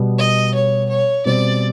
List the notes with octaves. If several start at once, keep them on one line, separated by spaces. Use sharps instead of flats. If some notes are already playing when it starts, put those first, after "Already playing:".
Already playing: B2 G3 B3
D#5
C#5
C#5
B2 G3 C4 D5